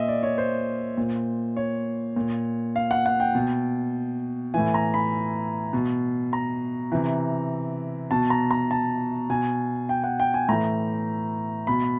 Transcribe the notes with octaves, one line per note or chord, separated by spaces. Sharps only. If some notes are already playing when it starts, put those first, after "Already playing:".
Already playing: A#2 D#5 E5
D5
C#5
C5
A#2
C#5
A#2
F5
F#5
F#5
G5
B2
A2 E3 G#5
A#5
B5
B2
A#5
C3 E3
B2 A5
A#5
A#5
A5
B2 G#5
G5
F#5
G5
G#5
A2 E3 A#5
B2 B5